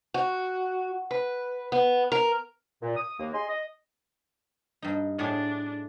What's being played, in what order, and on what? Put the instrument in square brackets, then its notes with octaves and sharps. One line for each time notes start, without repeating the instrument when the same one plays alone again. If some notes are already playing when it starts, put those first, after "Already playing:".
[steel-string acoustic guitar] F#4
B4
B3
A#4
[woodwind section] A#2
D#6
D#2 A#3
G#4 D#5 C6
D#5
[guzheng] G2 D#4
[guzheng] A2 A3 G#4 [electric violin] D4